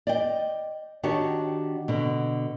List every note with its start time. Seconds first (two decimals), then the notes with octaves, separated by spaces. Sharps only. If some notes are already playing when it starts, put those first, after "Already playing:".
0.07 D5 D#5 G5
1.03 D#3 D4 F#4 G4 C#5
1.88 B2 D3